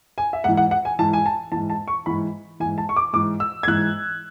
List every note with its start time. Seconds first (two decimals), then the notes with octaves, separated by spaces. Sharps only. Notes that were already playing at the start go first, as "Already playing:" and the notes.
0.18 G#5
0.33 E5
0.44 G#2 E3 F#5
0.57 F#5
0.71 F#5
0.85 G#5
0.99 G#2 E3 A5
1.13 G#5
1.26 A5
1.52 G#2 E3 A5
1.70 A5
1.88 C#6
2.06 G#2 E3 B5
2.60 E3 G#5
2.65 G#2
2.78 A5
2.89 C#6
2.96 D6
3.13 G#2 E3 D6
3.40 E6
3.63 G#6
3.68 G#2 E3 F#6